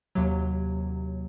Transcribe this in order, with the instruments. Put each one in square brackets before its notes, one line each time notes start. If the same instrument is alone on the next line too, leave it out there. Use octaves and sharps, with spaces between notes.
[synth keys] D#2 C3 F#3